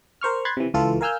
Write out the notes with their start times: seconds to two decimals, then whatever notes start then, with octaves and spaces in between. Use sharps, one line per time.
0.21 A#4 C5 C#6 F6
0.45 B5 C6 F#6 G#6 A6
0.57 C3 E3
0.74 C#2 E3 F4 A4
1.01 A#4 F5 G#5 E6 F6 G6